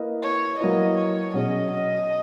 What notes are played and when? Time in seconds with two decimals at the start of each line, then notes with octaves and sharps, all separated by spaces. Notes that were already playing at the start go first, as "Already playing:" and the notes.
Already playing: A#3 E4 B4 D#5
0.22 C#5
0.59 F#3 A#3 E4 B4 D#5
0.97 C#5
1.34 B2 F#3 C#4 G#4 D#5
1.71 D#5